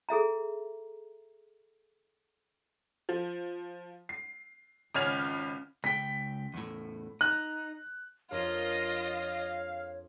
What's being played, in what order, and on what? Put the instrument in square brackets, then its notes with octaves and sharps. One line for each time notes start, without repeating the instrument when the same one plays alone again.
[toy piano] G#4 A4 E5 A#5
[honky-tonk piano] F3
C7
G#1 C#2 C#4 F6 G#6 F7
[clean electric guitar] C#2 G5 [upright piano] B6
[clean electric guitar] E2 A2
[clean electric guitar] D#4 [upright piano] F#6
[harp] F2 D4 A#4 [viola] F4 D#5 [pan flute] C#5 [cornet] F5